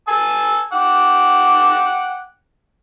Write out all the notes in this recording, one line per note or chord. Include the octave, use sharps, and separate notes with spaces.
G#5 A5 E6
F#5 G5 D6